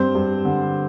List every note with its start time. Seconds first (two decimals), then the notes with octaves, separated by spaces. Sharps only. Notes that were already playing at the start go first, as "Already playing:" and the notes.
Already playing: G2 C4 C5
0.15 G2
0.45 D3